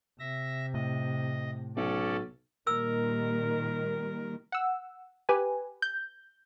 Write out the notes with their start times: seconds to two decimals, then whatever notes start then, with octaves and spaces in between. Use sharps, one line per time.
0.19 C3 E5 A#6
0.74 A2 D#5
1.76 B1 C#4 A4 D5
2.67 A#2 D#3 G3 A#4 E6
4.52 F#5 E6
5.29 G4 B4 G#5
5.82 G6